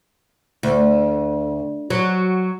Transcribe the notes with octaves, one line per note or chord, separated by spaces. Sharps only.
D2
F#3